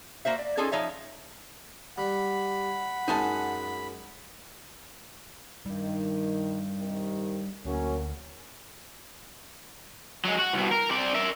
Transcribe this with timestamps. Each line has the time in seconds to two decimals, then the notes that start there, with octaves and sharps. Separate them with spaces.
0.25 A#3 F#4 C5 E5
0.39 D5
0.57 C#4 D#4 F4 G#4 A4
0.72 F3 D#4 C#5 E5
1.98 G3 F#5 B5
3.08 F#2 G#3 D#4 G#5 A5
5.66 D#3 G3 D4
6.80 C3 D#3
7.65 D2 F#3 A#3 C#4
10.25 F#3 G#3
10.39 F#4
10.54 C2 B2
10.71 A#4
10.91 C4 D5
11.15 A#4 E5